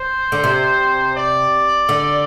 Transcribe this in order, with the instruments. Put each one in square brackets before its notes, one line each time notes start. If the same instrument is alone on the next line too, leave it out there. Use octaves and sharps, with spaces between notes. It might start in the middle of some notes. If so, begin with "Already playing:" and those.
Already playing: [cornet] C5
[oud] D3
C3
[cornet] D5
[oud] D3